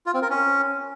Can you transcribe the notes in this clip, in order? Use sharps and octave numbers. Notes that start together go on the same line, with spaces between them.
F4
C4
A#4
C#4